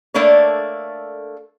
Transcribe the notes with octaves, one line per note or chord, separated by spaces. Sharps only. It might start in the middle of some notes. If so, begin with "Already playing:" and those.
A3 A#3 D4 A4 C#5